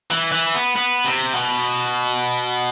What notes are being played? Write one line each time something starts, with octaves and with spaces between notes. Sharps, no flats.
E3
E3
B3
B3
C3
B2